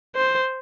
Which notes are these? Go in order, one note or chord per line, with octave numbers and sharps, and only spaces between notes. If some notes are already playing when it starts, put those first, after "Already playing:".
C5